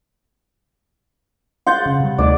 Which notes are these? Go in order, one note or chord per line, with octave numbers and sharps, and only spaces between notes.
F#5 C6 G6 A6
C#3
C3 G3
D2 A3 D#4 D5